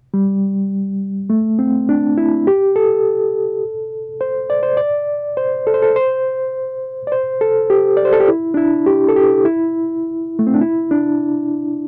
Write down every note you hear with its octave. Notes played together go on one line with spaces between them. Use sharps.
G3
A3
C4
D4
E4
G4
A4
C5
D5
C5
D5
C5
A4
C5
A4
C5
D5
C5
A4
G4
D5
C5
A4
G4
E4
D4
E4
G4
A4
G4
E4
A3
C4
D4
E4
D4